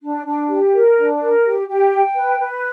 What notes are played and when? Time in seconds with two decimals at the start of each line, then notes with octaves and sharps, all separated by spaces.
0.01 D4
0.25 D4
0.48 G4
0.73 A#4
0.96 D4
1.19 A#4
1.44 G4
1.67 G4
1.91 G5
2.15 B4
2.39 B4